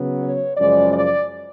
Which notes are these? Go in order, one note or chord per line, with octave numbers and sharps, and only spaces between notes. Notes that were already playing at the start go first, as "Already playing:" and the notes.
Already playing: C#3 F#3 B3
C#5
F#2 C#3 F3 G#3 D5
D5